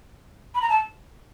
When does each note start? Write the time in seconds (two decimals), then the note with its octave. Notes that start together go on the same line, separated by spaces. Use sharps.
0.55 B5
0.62 A#5
0.70 A5